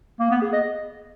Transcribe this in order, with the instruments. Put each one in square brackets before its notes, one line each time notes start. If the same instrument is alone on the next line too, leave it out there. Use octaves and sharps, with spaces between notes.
[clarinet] A#3
B3
G#4
D#5